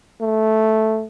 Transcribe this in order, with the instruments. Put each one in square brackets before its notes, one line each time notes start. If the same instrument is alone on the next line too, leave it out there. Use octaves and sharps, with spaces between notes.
[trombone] A3